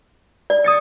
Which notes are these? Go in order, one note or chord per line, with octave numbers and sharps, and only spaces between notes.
D5
D#6 A6 C#7